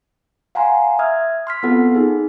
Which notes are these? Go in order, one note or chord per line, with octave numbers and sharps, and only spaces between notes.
F5 F#5 G#5 A#5 C6
E5 D#6 F6 G#6
C6 F6 B6
B3 C4 F4 A4 F#5
D#4 G#4